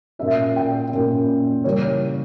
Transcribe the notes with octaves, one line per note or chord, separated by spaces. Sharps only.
A#2 A#3 C#4 E5
G5
A#2 A#3 C#4
C#3 E3 G3 A#3 C#5